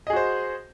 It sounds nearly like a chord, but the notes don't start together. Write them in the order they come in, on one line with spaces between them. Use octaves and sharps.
D#5 G#4 F#4 C5